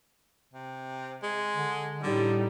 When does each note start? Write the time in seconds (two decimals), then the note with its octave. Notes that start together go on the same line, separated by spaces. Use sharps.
0.54 C3
1.23 G#3
1.54 D3
2.03 A2 D3 G3 D#4